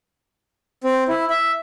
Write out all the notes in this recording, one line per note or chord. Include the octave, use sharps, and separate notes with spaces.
C4
E4
E5